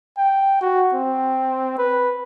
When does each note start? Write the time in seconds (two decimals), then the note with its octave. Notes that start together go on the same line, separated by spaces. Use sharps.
0.17 G5
0.61 F#4
0.94 C4
1.78 B4